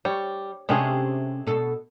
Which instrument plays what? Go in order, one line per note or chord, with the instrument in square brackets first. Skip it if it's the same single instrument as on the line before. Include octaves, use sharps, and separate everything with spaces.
[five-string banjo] G3 [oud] C#5
[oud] C3 C#4 G4 [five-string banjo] G#3 A3 G#4
[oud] B2 A4